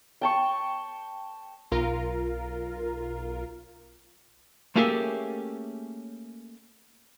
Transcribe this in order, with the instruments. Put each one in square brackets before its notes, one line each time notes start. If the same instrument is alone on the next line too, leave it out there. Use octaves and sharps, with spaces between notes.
[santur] G5 A5 C#6
[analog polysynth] B1 F4 A#4
[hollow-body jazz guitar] A3 A#3 C#4 G4 G#4 E5